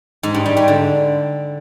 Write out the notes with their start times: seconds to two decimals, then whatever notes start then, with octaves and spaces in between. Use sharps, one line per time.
0.23 G#2
0.34 G2
0.46 G3
0.57 G#2
0.68 D3